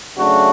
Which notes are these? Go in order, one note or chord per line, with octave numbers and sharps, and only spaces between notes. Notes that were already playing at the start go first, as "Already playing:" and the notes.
C#3 F#3 A3 D4 F#4